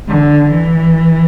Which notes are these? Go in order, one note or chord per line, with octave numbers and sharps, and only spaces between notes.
D3
E3